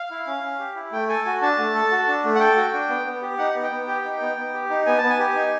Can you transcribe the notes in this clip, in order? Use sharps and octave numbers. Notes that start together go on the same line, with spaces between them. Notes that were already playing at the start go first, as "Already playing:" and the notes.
Already playing: F5
E4
C#4
C#4
G4
E4
A3 G5
A4 G#5
F#4 G#5
D4 A5
A3
A4
F#4
D4
A3
F#5
A4 G5
F#4
D4
B3
B3
G4
D#4 F#5
B3
G5
B3
G4 G5
D#4
B3
B3
G4
D#4
B3 G#5
A5
B3
G#5
G4
D#4